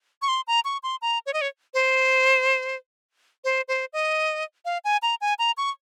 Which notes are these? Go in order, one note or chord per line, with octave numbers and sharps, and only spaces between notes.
C#6
C6
A#5
C#6
C6
A#5
C#5
D#5
C#5
C5
C5
C5
D#5
F5
G#5
A#5
G#5
A#5
C#6